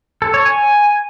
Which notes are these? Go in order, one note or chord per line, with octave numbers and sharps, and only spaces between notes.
A4
C#5
G#5